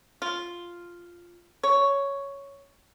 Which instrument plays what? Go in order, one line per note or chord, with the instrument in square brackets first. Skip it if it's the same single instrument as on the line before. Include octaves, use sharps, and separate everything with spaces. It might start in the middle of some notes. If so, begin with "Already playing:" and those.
[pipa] F4
C#5